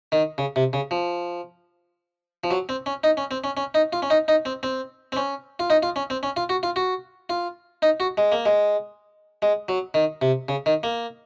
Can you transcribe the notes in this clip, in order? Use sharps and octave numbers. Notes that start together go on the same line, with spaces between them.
D#3
C#3
C3
C#3
F3
F3
F#3
C4
C#4
D#4
C#4
C4
C#4
C#4
D#4
F4
C#4
D#4
D#4
C4
C4
C4
C#4
F4
D#4
F4
C#4
C4
C#4
F4
F#4
F4
F#4
F4
D#4
F#4
G#3
A#3
G#3
G#3
F#3
D#3
C3
C#3
D#3
A#3